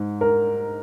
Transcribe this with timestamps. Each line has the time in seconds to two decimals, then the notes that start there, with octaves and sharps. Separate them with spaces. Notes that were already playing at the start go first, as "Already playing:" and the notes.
Already playing: G#2
0.21 A#4